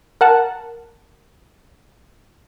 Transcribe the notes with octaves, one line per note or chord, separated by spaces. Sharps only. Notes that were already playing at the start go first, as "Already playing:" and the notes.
A#4 F#5 A5